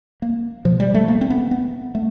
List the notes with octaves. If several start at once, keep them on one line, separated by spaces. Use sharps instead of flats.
A#3
B2 F3
G3
A3
A#3
C4
B3
B3
A3